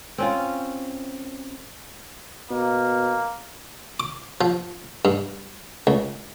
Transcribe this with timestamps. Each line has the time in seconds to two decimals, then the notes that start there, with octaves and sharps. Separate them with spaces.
0.18 C4 C#4 F4
2.51 B2 A#3
4.00 D6
4.41 F3
5.05 G2
5.87 C#2